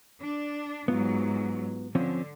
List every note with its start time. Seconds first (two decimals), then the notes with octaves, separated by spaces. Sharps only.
0.21 D4
0.88 G#2 F#3 B3 F4
1.95 D3 F3 C4 C#4